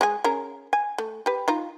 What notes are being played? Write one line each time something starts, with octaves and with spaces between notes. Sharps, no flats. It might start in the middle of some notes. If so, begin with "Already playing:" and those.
G#3 G#4 G#5
C#4 G#4 A#4
G#5
A3
G4 B4
D#4 F4 A#5